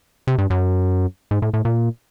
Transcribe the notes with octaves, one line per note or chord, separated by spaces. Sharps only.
C3
G2
F#2
G#2
A2
A2
A#2